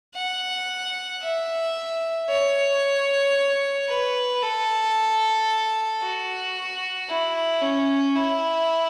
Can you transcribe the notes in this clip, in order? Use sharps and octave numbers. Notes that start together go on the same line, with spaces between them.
F#5
E5
C#5
B4
A4
F#4
E4
C#4
E4